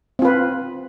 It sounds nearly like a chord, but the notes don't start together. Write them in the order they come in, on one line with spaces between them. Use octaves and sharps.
C4 F4 B4